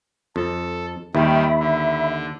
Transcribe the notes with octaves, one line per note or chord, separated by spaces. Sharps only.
F2 A4
D#2 D#3 G3 E5 B5
D3